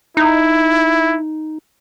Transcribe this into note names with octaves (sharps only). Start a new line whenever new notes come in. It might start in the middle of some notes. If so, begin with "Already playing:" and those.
D#4 E4